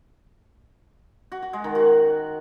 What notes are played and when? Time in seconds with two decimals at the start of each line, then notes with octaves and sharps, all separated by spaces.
1.32 F#4
1.42 F#4
1.53 G#3
1.64 D#3
1.75 F#4